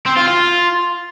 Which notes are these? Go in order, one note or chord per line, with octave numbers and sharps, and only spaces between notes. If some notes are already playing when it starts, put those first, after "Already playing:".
C4
F4
F4